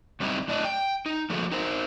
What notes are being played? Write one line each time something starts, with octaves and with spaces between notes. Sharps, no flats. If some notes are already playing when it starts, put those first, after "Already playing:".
F#2 G3 C4 D#4 E4
F#2 A2 D4 D5 D#5
G5
D#4
F3 A3 A#3 F#4 G#4 A4
D#4 A#4 C5